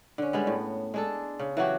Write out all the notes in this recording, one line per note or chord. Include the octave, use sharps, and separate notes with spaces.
D3 C#4
G3 G#3 B3
A2
G#3 D4 A4
C#3
E3 F#3 F#4 G4